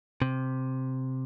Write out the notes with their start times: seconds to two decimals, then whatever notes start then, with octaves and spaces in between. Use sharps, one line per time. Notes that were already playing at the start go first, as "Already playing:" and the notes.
0.22 C3